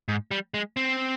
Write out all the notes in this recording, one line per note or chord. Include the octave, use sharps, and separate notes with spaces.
G#2
G3
G#3
C4